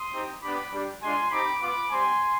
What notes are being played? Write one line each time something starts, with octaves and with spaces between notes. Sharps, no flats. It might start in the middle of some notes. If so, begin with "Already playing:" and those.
Already playing: C6 D#6
C4 D#4 G4
B3 D4 G4 B5 D6
G3 D4 G4
G#3 D4 F4 G#5 C6
C4 D#4 G4 B5 D6
B3 F4 B5 D6
G3 C4 G4 G#5 C6